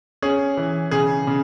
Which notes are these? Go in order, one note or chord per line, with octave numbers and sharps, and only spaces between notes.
C#4 G#4
E3
C#3 G#4
C#3